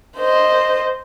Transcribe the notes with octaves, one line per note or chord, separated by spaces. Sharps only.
C5 D#5